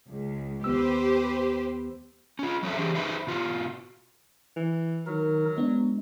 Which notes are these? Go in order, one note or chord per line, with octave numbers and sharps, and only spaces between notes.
C#2
D#2 B3 G4 B4 C5 E6
C#4 F4
F#3 C4 C#4 A4 C5 E5
E3 D4 G4 G#4 C5
D#4 G#4 B4 C5 E5
B2 F4 F#4
E3
D#3 F#3 D#4 A#4
G#3 B3 D4